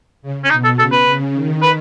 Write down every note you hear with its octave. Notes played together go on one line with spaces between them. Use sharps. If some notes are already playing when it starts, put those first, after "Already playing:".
C#3
C#4
B2 D#4
A4
C#3 A4
B4
C#3
D#3
B4